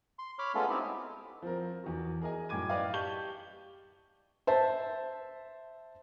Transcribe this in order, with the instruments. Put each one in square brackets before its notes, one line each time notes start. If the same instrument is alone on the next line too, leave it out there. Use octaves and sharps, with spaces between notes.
[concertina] C6
C#5 B5 D6 F6
G#3 A3 B3 C#4 F4 A4
C4 D#4 E4 G4
[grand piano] F3 C4 A#4
E2 F#4
G#4 A#4 D#5 G#5
F#2 A2 G5 D6 G#6 D#7
B4 D5 D#5 F5 G5
G4 A5 C#6 G6 G7
[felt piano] C5 E5 A5